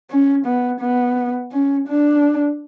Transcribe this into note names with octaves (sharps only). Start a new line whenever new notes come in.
C#4
B3
B3
C#4
D4